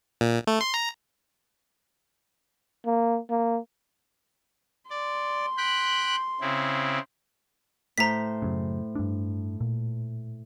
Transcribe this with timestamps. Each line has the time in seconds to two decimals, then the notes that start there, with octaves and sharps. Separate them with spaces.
0.21 A#2
0.47 A3
0.61 C6
0.74 A#5
2.86 A#3
3.30 A#3
4.90 D5 C6
5.57 G5 B5 F#6
6.41 C#3 C4 E4
7.98 A2 C5 A#5 B6
8.42 F#2 C#3
8.95 G2 D4
9.61 A#2